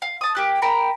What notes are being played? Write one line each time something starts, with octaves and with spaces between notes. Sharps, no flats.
F5
A5 D#6
A#3 G4 F#6
A#4 G5 A#5 B5